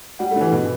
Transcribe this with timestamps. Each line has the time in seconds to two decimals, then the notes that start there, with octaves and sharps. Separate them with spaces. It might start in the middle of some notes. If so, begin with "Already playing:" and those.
0.19 G3 F#5
0.31 A3
0.36 D3
0.41 E3 B4
0.52 B2